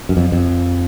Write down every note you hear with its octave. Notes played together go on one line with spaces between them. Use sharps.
F#2
F2
F2